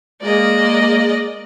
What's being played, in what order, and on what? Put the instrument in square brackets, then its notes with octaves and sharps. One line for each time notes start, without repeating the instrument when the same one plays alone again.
[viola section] G#3 A#3 [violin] D5 D#5